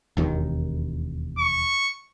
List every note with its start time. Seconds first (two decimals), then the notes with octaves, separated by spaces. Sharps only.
0.17 E1 D#2 D#3
1.38 C#6